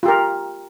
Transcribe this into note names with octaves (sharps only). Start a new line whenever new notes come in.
F4 G4 A#4